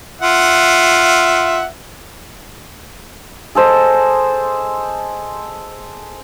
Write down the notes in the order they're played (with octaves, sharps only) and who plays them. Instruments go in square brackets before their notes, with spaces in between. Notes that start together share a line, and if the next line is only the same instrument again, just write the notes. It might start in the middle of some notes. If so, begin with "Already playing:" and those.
[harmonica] F4 E5 F#5
[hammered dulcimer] G#4 A4 C5 D#5